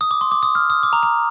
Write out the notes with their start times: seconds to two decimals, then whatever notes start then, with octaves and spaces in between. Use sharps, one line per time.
0.01 D#6
0.11 D6
0.21 C6
0.32 D6
0.43 D#6
0.55 F6
0.70 D#6
0.83 D6
0.93 A#5
1.03 A#5